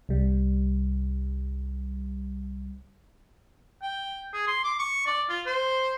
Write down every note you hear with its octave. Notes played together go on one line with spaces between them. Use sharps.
C2 G3
G5
G#4
C6
D6
C#6
D5
F4
C5